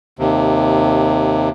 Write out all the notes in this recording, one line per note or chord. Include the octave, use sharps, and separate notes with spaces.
D#2 C3